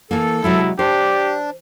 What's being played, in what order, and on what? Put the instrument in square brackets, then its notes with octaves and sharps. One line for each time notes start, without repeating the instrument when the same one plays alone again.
[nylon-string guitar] E3 A#3 [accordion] A4
[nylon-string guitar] C3 F#3 G#3 [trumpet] E4
[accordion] D4 [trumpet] G4 [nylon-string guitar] C5